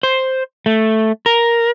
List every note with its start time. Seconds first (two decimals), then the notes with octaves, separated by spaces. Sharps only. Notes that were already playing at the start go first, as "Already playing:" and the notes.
0.03 C5
0.66 A3
1.26 A#4